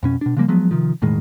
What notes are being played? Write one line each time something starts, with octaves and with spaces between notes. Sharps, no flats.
F2 B2 C#4
B2 D4
C#3 F3 G3 A#3
F3 F#3 G#3 B3
C3 D#3 F3
E1 A2 D#3 G#3